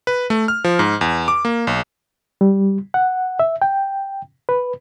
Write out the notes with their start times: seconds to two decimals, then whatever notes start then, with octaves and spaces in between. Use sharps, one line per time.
0.07 B4
0.30 A3
0.48 F6
0.64 F3
0.79 G#2
1.01 E2
1.28 D6
1.45 A#3
1.67 B1
2.41 G3
2.94 F#5
3.40 E5
3.62 G5
4.49 B4